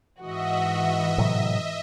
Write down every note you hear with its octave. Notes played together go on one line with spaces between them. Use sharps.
G#2 E3 F#4 D#5 E5
A2 C3 F#3